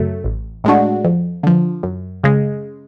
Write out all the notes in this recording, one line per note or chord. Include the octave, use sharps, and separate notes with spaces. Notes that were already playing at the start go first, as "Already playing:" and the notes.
Already playing: F#2 C#3 F#3 A3
A1
A2 G#3 D4 F#4
F2
D3 F3
F#2
C#3 G#3